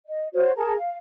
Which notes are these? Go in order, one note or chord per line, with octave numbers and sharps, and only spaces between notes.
D#5
F#4 C5 C#5
G#4 A#4 A5
F5